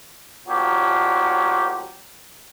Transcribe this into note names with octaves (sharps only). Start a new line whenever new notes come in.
A1 D#2 A#2 F3 F#3 G4